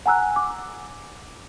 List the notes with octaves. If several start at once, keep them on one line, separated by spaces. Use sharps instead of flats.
F#5 G#5 A#5 E6 F#6
D6